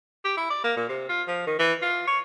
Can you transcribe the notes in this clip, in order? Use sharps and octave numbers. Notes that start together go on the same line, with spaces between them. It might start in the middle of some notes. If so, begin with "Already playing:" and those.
G4
E4
D5
A#3
A#2
C3
F4
F3
D#3
E3
F4
C#5